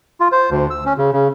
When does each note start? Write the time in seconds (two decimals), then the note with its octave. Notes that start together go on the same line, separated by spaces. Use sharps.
0.20 F4
0.32 C5
0.51 D2
0.70 E6
0.86 C#4
0.98 C#3
1.13 C#3